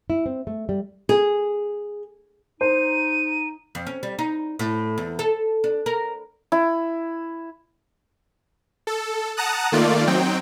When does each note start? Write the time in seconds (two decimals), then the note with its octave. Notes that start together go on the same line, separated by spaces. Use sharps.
0.10 E4
0.26 C4
0.47 A3
0.69 G3
1.09 G#4
2.61 D#4 C5 D#7
3.75 F2
3.87 C#4
4.03 G3
4.19 D#4
4.59 A2
4.98 E2
5.19 A4
5.64 D4
5.86 A#4
6.52 E4
8.87 A4
9.37 F#5 A5 A#5 D#6 F#6
9.72 D#3 A3 A#3 F4 D5
10.07 F#3 C4 D#4 G5